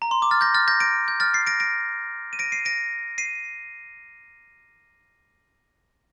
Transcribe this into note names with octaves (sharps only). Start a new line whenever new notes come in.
A#5
C6
D6
F6 A6
G6 A#6
F6 A6
G6 A#6
A#6 D7
G6
F6 A6
A6 C7
A#6 D7
A#6 D7
D#7
A#6 D7
C7 D#7
A#6 D7
C7 D#7